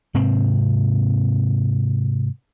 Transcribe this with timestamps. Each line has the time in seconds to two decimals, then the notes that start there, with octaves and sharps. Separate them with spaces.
0.14 G#2 C3 C4